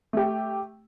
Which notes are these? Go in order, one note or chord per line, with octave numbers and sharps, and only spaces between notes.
A3 G4